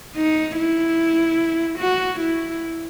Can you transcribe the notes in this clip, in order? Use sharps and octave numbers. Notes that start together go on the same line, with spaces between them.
D#4
E4
F#4
E4